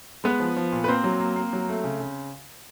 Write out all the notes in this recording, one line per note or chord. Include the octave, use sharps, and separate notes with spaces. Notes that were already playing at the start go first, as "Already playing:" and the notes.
G#3 B3 B4
F3
F3
A#2
B4
A#3 C4 C5
F#3
A#3
A#3
F#3
A3
C#3
C#3